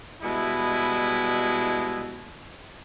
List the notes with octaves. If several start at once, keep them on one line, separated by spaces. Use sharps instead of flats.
B2 G3 G#3 E4